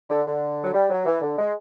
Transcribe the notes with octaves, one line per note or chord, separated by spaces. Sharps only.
D3
D3
F#3
G3
F#3
E3
D3
G#3